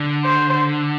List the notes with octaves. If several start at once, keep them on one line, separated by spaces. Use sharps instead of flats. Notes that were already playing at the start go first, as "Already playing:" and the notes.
Already playing: D3
C5